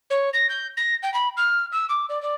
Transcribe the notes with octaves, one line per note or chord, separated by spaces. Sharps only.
C#5
A#6
G6
A#6
G5
B5
F6
E6
D6
D5
D5